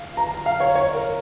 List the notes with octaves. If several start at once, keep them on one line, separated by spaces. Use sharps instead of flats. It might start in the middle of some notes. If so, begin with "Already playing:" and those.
Already playing: F5
A#5
F5
C#5
C#5
A#4